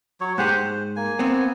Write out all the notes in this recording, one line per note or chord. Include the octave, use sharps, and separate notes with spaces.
F#3 C#5
G#2 G4 G#4 C5 F#5
C5
A#3 G#5
B3 C4